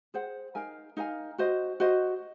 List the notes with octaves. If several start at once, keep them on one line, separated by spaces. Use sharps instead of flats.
G#4 C5 F#5
D#4 A#4 F5 G#5
D#4 A#4 F5 G#5
F#4 C5 D#5
F#4 C5 D#5